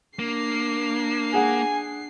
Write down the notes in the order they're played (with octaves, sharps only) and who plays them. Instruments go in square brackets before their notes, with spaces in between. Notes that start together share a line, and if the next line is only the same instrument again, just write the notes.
[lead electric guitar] A#3 [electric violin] D4 C7
[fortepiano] G#4 F#5 [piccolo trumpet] G#5